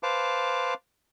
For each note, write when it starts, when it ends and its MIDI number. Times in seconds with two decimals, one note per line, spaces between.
0.03 0.74 71
0.03 0.74 72
0.03 0.74 77
0.03 0.74 81
0.03 0.74 86